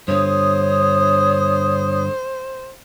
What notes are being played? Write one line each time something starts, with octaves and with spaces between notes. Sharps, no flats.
G2 D3 C5 C#5 D#6